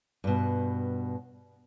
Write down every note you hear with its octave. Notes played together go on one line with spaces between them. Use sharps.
G2 B2